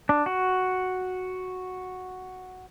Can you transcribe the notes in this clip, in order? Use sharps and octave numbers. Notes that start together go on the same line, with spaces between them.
D4
F#4